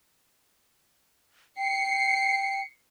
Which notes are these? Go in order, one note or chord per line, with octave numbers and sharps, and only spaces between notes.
G5 C7 C#7